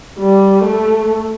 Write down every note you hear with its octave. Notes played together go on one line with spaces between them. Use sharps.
G3
A3